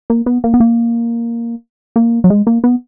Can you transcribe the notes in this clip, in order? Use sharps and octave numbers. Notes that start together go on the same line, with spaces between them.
A#3
B3
A#3
B3
A#3
A#3
F#3
G#3
A#3
B3